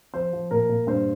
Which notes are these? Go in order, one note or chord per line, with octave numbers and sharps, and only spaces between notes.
F3 C5
F3
A#2 A#4
A#2
G2 C5